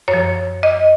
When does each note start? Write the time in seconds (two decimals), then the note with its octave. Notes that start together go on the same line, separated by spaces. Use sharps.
0.08 F#2 C#5
0.13 F3
0.63 D#5